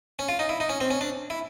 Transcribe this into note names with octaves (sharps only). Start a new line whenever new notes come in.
C#4
F4
D#4
E4
D#4
C#4
C4
C#4
D4
E4